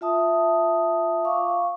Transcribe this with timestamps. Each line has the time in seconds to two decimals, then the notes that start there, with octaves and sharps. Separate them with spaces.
0.01 F4 E5 A5 D#6
1.25 F5 C#6 D6